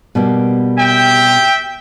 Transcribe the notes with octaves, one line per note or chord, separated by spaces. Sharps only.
B2 G3 A#3
E5 G5